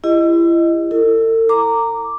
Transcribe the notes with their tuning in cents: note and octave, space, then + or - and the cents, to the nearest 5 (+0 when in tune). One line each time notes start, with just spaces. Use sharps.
E4 +35 G4 +35 D#5 +0
E4 +0 A4 +45
A#5 -10 D6 +0